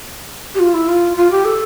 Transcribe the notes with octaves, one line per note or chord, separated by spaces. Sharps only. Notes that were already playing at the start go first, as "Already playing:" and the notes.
G4
F4
E4
F4
F4
G4
A4